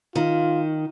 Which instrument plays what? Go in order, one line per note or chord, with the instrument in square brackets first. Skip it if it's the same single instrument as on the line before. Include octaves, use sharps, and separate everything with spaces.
[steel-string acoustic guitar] D#3 [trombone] F4